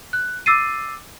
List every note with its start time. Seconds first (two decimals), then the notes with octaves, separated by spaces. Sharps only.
0.13 F#6
0.46 D6 E6 A6 C7 D#7